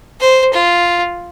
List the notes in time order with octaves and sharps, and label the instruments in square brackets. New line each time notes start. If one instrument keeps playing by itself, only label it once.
[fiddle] C5
F4